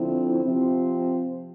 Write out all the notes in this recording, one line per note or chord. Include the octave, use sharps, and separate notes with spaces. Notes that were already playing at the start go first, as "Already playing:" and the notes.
Already playing: D3 F3 C4 E4
C3 F3 C4